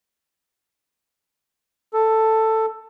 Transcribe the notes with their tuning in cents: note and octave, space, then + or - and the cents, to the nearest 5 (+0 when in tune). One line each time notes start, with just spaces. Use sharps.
A4 +10